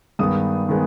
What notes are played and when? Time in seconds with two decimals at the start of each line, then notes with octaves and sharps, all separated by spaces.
0.19 G2 D#3 G#3 B3 D#6
0.69 D#3 G#3 B3